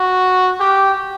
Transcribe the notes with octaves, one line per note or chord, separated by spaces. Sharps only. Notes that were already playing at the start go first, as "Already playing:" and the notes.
Already playing: F#4
G4